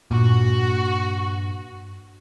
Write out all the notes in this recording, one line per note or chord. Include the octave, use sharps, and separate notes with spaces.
G2 A#2 F#4